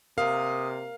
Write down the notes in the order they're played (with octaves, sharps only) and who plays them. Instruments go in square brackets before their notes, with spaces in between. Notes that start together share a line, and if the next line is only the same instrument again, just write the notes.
[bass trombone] C3 [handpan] A#4 [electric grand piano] F5 [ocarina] D#6